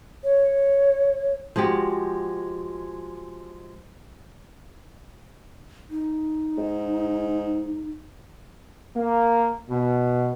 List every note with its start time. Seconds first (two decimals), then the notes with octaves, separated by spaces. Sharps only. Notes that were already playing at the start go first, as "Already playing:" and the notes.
0.24 C#5
1.56 F3 G#3 F#4 G4
5.90 D#4
6.58 G#2
8.95 A#3
9.70 B2